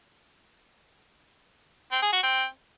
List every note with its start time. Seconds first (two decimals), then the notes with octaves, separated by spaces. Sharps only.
1.92 C4
2.02 G#4
2.13 F#4
2.23 C4